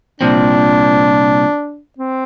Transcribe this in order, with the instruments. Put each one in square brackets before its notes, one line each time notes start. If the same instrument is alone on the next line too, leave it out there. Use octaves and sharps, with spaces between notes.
[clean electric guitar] C2 A#2 F3 C4 [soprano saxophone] D4
[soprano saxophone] C4